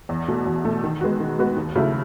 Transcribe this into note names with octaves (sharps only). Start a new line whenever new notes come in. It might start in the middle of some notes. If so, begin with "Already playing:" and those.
E2
B2 A3
E2
B2 A3
D#3
G#3 B3 F#4
D#3
G#3 B3 F#4
D#2
C#3 F#3 A3 E4